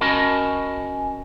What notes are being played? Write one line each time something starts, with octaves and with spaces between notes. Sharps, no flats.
C#4 F#4 A#4 D#5 A5 B5